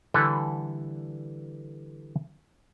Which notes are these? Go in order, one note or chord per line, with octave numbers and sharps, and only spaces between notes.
D3 E3 G3 A4 B4